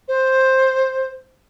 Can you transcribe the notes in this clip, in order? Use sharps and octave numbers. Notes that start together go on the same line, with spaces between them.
C5